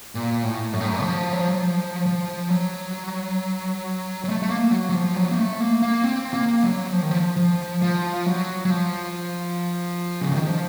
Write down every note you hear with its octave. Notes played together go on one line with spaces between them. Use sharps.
A#2
A2
F#2
A2
F#2
F3
F#3
F3
F#3
F3
F3
F#3
F#3
A3
A3
A#3
F#3
F#3
F3
F#3
A#3
A3
A#3
A#3
C4
A#3
F#3
F3
D#3
F3
F3
F3
F#3
F#3
F3
C#3
D#3
F3